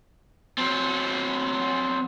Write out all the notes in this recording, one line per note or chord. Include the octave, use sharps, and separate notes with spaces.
F#3 C4